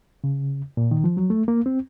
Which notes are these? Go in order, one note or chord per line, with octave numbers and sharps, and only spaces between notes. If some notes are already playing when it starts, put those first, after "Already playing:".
C#3
A#2
D#3
F3
F#3
A3
A#3
C4